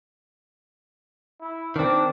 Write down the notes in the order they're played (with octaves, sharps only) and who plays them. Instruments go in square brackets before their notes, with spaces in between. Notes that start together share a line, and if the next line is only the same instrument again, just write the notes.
[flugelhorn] E4
[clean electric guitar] D#3 C4 [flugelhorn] D4